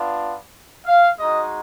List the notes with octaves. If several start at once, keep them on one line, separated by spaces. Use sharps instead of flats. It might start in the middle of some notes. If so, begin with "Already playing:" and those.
Already playing: B3 D4 F4
F5
G#3 D#4 F#4 D#5